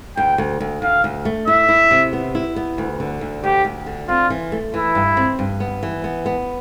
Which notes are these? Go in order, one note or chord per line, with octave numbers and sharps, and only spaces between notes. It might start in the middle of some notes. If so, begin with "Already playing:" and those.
D2 G5
D2
D2
D2 F5
D2
A3
E4 E5
E4
C3
B3
E4
B3
D2
D3
D2
D2 G4
D2
D3
C4 F4
E3
A3
E3 E4
G2
C4
G2
B3
E3
B3
B3